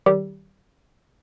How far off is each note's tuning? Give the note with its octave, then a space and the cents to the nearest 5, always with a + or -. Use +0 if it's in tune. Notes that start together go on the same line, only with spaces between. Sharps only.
D#3 +0 G3 -30 G4 +0